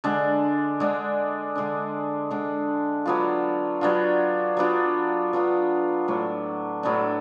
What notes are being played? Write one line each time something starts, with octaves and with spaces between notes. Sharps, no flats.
D3 G#3 D4
D3 G#3 D4
D3 G#3 D4
D3 G#3 D4
F#3 B3 D4 F4
F#3 B3 D4 F4
F#3 B3 D4 F4
F#3 B3 D4 F4
A2 F#3 B3 D4
A2 F#3 B3 D4